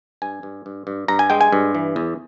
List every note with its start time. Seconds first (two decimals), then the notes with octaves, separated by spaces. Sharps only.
0.22 G2 G#5
0.43 G2
0.66 G2
0.87 G2
1.08 G2 A#5
1.19 G#5
1.30 G#3 G5
1.41 G#5
1.52 G2
1.75 E3
1.96 E2